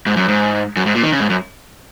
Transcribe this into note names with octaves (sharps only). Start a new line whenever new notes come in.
G#2
F#2
G#2
F#2
G#2
A#2
D#3
C#3
G#2
F#2